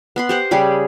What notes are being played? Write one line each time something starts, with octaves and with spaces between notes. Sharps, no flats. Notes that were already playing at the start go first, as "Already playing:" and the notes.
B3 B5 C6
G4 C5 F#5
C#3 G3 G#4 B5